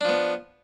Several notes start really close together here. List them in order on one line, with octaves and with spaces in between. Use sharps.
D4 F3 B3